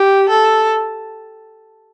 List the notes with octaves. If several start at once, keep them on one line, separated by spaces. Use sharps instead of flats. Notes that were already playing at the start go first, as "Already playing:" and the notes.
Already playing: G4
A4